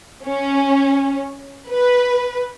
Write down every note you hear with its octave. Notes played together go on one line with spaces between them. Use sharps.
C#4
B4